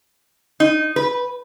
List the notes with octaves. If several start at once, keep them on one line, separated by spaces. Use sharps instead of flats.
D#4
B4